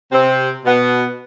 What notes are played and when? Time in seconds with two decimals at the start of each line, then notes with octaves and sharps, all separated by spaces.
0.11 C3 C4
0.65 B2 B3